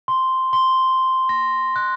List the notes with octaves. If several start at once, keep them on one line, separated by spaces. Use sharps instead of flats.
C6
C6
A#6
F#6